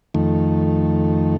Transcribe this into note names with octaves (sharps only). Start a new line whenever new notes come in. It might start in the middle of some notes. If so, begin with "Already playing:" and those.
F2 D#3 A3